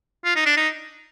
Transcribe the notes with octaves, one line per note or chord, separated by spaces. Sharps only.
F4
D#4
D4
D#4